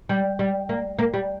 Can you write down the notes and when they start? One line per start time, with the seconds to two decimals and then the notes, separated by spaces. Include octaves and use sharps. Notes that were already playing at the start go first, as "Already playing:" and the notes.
0.09 G3
0.39 G3
0.69 A#3
0.99 A#3
1.14 G3